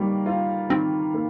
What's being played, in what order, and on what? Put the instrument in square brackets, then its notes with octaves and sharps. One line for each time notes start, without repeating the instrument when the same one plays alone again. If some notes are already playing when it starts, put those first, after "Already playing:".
Already playing: [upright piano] D#3 G3 A#3
F4
[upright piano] D#3 [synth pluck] C4
[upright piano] A#3